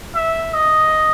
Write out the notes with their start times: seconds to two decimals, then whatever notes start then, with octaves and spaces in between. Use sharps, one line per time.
0.15 E5
0.54 D#5